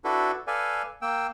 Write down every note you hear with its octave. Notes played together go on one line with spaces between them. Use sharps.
D4 E4 F#4 A4 B4
A4 B4 D5 F5 G#5
A#3 G5 E6